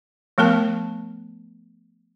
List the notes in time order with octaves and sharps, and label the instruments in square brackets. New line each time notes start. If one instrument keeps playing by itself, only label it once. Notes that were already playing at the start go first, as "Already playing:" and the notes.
[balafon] F3 A3 B3 A#4 A5